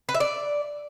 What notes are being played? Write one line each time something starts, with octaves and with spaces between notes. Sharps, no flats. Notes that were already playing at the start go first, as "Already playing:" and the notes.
B4
E5
D5